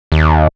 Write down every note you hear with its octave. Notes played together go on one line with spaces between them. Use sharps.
D#2